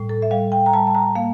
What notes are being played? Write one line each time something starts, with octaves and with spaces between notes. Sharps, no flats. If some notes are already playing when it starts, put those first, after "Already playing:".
Already playing: A2 G3
A4
E5
G3 F5
G5
A#5
G3 A5
A5
A#5
A#3 F5